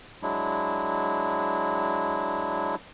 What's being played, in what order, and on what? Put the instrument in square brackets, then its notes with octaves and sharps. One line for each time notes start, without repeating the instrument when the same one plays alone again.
[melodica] F#3 G#3 D4 E4